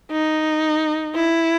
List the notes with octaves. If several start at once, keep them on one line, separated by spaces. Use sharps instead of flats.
D#4
E4